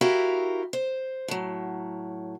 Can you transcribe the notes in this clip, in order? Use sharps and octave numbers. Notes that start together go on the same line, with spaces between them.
E4 F#4 G4 A#4 E5 F5
C5
A2 F#3